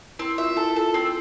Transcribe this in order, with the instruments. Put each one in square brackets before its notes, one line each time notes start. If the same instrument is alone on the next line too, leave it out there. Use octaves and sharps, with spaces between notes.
[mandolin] C4 [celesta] E4
[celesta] F4 [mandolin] E5
[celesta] E4 [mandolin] A4
[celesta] F4 [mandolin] A4
[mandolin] C4
[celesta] A4